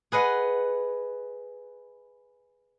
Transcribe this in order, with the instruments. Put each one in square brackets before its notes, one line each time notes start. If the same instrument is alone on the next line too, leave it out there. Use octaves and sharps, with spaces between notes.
[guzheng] G#4 B4 D#5 F#5